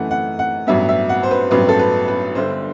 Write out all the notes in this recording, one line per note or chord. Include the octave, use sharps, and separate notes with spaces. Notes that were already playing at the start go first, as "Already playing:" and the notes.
Already playing: F#2 E3 A3 F#5
F#5
F#5
A1 G2 F#3 B3 E5
E5
F#5
C5
B4
A1 G2 F#3 B3 B4
A4
B4
B4
G1 G2 D3 C5